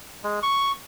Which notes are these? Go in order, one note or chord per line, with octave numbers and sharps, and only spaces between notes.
G#3
C#6